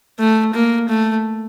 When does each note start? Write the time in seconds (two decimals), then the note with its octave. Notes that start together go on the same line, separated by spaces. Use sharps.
0.19 A3
0.54 A#3
0.89 A3